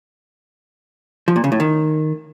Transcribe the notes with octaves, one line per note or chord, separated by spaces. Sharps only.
F3
A#2
C#3
A2
D#3